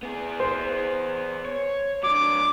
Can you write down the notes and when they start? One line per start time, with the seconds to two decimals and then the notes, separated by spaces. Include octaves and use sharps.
0.03 B3 G#4
0.40 C5
1.45 C#5
2.04 F#3 D4 D6